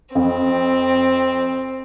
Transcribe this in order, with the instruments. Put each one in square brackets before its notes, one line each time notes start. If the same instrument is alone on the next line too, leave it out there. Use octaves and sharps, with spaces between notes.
[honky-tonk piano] F2 [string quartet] C4